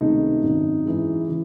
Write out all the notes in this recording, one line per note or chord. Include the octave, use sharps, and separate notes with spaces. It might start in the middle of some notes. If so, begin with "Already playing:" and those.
C#2 C3 D#3 A3 D#4
G#1 F#2 D#3
F#2 E3 G#3
C#3 E3